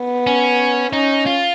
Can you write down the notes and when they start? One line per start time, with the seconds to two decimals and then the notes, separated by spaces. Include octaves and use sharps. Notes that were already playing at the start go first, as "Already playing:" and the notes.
Already playing: B3
0.27 C#4
0.93 C#4 D#4
1.26 F4